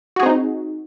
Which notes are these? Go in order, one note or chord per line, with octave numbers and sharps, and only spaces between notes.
C4 D#4 F#4 G#4